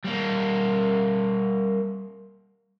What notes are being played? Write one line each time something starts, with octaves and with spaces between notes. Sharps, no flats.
G3 A#3